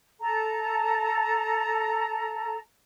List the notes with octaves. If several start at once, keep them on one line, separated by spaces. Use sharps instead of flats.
A4 A5 A#5